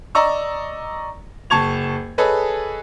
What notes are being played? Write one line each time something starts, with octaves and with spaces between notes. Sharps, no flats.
D5 D#5 A#5 C#6 E6
F#1 A5 C#6 G#6 F7
G#4 A4 B4 C#5 D#5